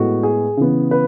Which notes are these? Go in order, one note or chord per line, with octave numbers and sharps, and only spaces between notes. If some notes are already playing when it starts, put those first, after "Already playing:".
Already playing: A2 G#3 B3 F#4
G#4
C#3 E3 B3
B4